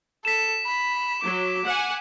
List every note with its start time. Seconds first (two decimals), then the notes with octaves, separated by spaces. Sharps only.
0.25 A4 B6 E7
0.66 B5
1.23 F#3 D6
1.66 F#5 G#5